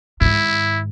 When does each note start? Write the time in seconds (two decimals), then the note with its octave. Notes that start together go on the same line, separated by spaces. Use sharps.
0.21 G#2 D#3 E4